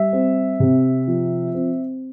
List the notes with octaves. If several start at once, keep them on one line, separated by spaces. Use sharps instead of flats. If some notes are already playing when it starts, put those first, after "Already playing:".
Already playing: G3 E5
C4
C3
F3
C4